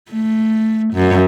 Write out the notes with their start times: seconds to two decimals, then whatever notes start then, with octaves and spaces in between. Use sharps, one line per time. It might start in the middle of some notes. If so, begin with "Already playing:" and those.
0.12 A3
0.94 F#2